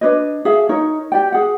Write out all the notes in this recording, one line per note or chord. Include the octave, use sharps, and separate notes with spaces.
D4 B4 C#5 D#5
G#4 A4 E5 F5
D#4 A#4 C#5
G4 D5 G5
G#4 F#5